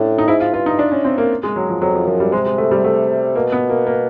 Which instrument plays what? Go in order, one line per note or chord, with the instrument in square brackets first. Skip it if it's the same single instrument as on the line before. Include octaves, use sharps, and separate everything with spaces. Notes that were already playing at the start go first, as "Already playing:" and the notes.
Already playing: [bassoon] A2 [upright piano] C#4 D4
[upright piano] D#4
[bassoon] G#2 [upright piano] E4
[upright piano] F4
[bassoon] G2 [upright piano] F4
[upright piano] D#4
D4
C#4
C4
A#3
G#3
F#3
F3
[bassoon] F2 [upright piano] F#3
[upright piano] F3
[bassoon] F#2 [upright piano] F3
[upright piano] G3
[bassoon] C3 [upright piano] G#3
[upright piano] G#3
A3
G3
A3
[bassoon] B2 [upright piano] A#3
[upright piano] B3
A#3
A#3